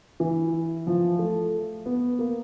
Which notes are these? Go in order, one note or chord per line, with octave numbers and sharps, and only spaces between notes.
E3
F3
A3
B3
A#3